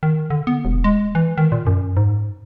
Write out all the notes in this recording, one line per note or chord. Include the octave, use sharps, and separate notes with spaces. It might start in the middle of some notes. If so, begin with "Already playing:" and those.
D#3
D3
B3
E1
G#3
E3
D#3
A#2
F#2
G#2